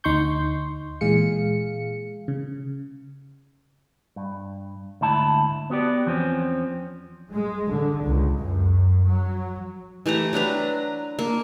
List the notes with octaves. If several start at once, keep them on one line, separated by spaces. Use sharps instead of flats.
D2 D#4 C6 C#6 G6
A#2 E3 G#3 G#4 F5 C#7
C#3
G2
D2 G#2 E4 A5
B3 F#4 G4 D5
E2 F3 C4 C#4
G#3
D3
C#2
F#2
F#3
E3 A3 G4 A#5
F#3 D4 B4 A#5
A#3